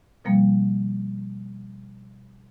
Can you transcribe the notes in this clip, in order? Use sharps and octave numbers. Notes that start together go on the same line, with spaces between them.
B2 F3 G3 A#3